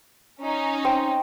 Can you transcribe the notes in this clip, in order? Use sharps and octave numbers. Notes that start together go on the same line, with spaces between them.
C#4 D#4
C4